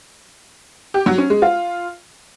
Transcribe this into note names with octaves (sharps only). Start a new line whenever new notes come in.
G4
F#3
C#4
G#3
F4